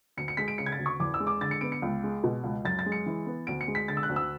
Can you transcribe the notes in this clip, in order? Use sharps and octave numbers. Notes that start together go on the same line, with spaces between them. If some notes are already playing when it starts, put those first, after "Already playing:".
D2 C#7
C#7
G#3 B6
D7
C#3 C#7
G#6
A6
D2
C#6
E2 D6
E6
G#3
D6
D3 A6
C#7
B3 D7
C#7
C#2
G#3
B2
C#2
F#2 A6
A6
G#3
C#7
E3
B3
D2 D7
C#7
G#3
B6
D3 A6
E6
F#6
D2
E6